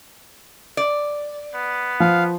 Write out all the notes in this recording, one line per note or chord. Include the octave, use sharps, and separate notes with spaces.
D5
B3
F3 F5